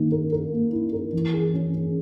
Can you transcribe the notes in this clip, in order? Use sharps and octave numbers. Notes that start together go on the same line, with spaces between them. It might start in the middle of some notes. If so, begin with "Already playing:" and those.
Already playing: D#3 A#3
A#4
A#4
A#3
E4
A#4
E3
G#4
C#4
C#4